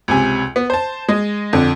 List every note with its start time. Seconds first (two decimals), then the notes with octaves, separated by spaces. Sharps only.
0.08 C#2 C3 G#5
0.56 B3
0.70 C5 A5
1.08 G#3 D#5
1.53 F2 D3